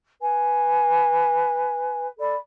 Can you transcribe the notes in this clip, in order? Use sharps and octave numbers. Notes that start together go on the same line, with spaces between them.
B4 G#5
A4 D5 B5